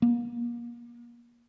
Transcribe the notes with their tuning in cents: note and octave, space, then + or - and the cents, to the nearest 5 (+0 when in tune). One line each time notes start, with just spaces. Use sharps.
A#3 +35